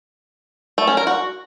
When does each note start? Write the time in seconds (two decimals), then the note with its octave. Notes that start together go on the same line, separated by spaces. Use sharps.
0.78 A3
0.87 C#4
0.97 A#4
1.07 F#4